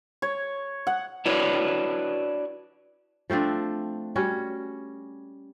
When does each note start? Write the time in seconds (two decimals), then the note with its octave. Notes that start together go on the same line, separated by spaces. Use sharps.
0.22 C#5
0.87 F#5
1.26 D4 E4 F#4 B4 C#5 D5
3.30 F3 A3 C4 D4
4.16 G3 C#4 F#4